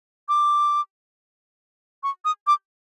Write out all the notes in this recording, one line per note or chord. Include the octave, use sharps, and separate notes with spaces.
D6
C#6
D#6
D6